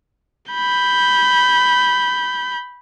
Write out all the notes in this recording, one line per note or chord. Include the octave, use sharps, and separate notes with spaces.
B5 G6